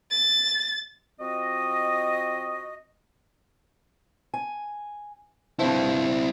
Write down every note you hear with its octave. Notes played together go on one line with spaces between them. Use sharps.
A6
F3 C4 F#4 D#5
G#5
G2 F3 C4 E4